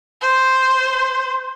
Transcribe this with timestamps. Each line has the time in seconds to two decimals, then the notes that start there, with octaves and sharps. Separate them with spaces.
0.22 C5